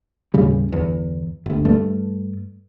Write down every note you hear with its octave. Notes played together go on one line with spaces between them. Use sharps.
D#2 A2 C#3 G3
G1 E2
G1 D2
G2 A3